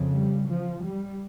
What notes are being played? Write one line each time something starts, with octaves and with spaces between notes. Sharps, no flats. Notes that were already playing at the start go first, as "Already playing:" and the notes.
Already playing: F2 C#3
G3
F3
G3